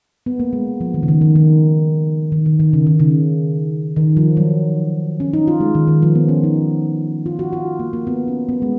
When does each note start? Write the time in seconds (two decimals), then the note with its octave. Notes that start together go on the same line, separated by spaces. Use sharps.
0.26 B3
0.40 A#3
0.53 G#3
0.80 F3
0.94 D#3
1.03 C#3
1.08 D#3
1.21 D#3
1.36 D#3
2.32 D#3
2.46 D#3
2.60 D#3
2.73 C#3
2.87 D#3
3.00 C#3
3.96 D#3
4.17 F3
4.37 F#3
5.20 C#4
5.33 D#4
5.48 F4
5.60 G#3
5.75 D#3
5.87 D#3
6.02 F3
6.15 B3
6.29 C#4
6.43 D#4
7.26 F4
7.39 F#4
7.53 F4
7.79 A#3
7.93 A#3
8.07 B3
8.28 C#4
8.49 B3
8.62 G#3